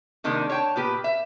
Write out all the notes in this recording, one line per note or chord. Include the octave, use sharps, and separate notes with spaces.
C3 D#3 G#3 A#3 C4 D4
C#5 G5 A5
A#2 B3 G4 B4
E5